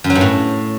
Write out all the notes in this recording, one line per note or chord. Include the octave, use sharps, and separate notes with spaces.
F#2
F#3
G2
A2